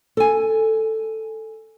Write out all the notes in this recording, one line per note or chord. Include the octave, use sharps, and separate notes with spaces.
A4 G#5